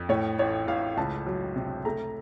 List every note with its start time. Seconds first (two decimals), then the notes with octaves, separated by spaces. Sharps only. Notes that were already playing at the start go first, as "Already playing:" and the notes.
Already playing: F2
0.09 A2 C#5
0.39 A1 C#5
0.67 A1 F5
0.97 C#2 A5
1.26 F#3
1.56 C3
1.85 A3 A#5